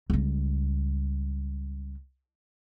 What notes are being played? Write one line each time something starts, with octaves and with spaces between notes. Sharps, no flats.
C#2 G3